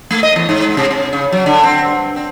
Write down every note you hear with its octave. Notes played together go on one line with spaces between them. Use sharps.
A3
D#5
E2
G#2
C3
C3
C#3
F#3
D3
C4
G2
C4